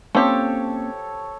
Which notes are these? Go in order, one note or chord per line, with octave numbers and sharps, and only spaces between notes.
F3 A#3 C4 C#4 G4 A4 C#5